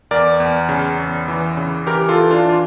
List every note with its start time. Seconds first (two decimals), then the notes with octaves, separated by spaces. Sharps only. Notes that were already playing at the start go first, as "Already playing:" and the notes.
0.11 E2 A#4 D5
0.40 E2
0.69 C#3
0.98 E2
1.28 E3
1.57 C#3
1.87 E3 G4 A#4
2.09 F4 A4
2.17 E3
2.31 D4 F4
2.46 E3 F4